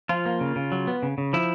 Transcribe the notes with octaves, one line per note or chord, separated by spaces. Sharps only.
F3 F4
A#3
C#3
C#3
F#3
B3
C#3
C#3
F3 E4